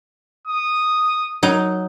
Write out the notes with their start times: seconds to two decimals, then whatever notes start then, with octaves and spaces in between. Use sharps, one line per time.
0.47 D#6
1.43 F#3 D#4